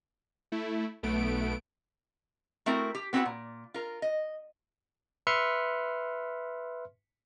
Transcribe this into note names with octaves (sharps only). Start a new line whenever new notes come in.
A3 E4
B1 A3 B3 D7
A3 C4 E4 F#4 A#4
G4
B3 C4 E4 F#4 B4 F#5
A#2
F4 A#4
D#5
B4 E5 C6 F6 C#7